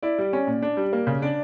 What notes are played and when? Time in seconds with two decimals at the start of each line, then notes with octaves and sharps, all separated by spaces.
0.03 E4 D5
0.18 G3
0.33 C#4
0.47 A#2
0.62 D4
0.77 G3
0.93 A#3
1.07 C#3
1.22 D4 D5